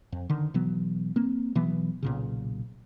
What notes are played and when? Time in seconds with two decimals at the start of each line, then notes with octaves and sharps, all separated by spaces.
0.12 F2
0.29 D3 D#3
0.54 B2 E3 F#3 B3
1.16 A#3 C4
1.55 B2 E3 F#3 B3
2.03 B1 A#2 C#3